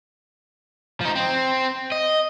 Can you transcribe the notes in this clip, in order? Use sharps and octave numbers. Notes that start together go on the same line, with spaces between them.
F3 D#4
C4
D#5